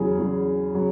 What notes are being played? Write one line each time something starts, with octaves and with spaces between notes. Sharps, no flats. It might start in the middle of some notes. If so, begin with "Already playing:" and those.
Already playing: E2 C#3 F#3 G#4
E2 C#3 F#3
C#3 F#3